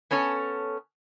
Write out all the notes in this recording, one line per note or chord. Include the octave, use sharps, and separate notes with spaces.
B3 C#4 A4 C#5 G#5